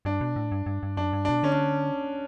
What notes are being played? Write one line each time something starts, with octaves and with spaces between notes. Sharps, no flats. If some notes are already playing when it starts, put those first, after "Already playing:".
G2 D4
B2
A2
G2
G2
G2
F#2 D4
G2
B2 D4
D3 C#4
D4